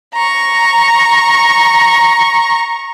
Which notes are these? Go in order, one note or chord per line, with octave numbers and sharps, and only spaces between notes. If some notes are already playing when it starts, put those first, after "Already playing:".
A#5 C#6